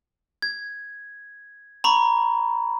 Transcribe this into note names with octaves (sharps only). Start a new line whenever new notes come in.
G#6
A#5 B5 C#6